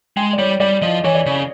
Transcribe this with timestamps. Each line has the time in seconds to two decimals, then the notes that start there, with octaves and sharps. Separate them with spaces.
0.17 G#3 G5
0.33 D5
0.38 G3 C#5
0.60 G3 D5
0.82 F3 D#5
1.04 E3 C#5
1.15 D5
1.26 C#3